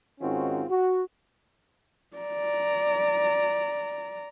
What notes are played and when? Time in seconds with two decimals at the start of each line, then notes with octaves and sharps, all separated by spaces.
0.21 G#2 D#3 C4 C#4 F4 F#4
0.69 F#4
2.17 D5 A#5